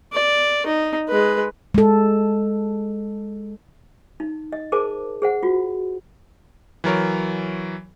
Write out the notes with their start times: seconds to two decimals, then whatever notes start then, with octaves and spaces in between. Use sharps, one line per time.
0.13 D5
0.66 D#4
1.09 G#3 B4
1.74 G#3 A4
4.20 D#4
4.52 D#5
4.72 G#4 A#4 C5 A5 D6
5.22 G#4 C5 F#5
5.43 F4 F#4
6.84 E3 F#3 A#4 C#5